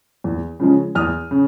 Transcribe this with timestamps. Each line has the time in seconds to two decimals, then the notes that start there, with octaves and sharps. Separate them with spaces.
0.24 E2
0.60 C#3 F3 G#3 C#4
0.95 E2 D#6 F6
1.31 C#3